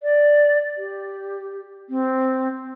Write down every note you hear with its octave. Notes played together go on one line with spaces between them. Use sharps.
D5
G4
C4